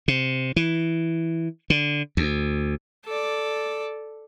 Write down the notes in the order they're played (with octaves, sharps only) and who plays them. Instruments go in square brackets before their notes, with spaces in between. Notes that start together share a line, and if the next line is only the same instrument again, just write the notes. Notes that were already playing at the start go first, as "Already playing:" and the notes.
[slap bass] C3
E3
D3
D2
[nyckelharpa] A4 D5